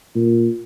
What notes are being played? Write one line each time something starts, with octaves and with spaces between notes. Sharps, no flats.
A#2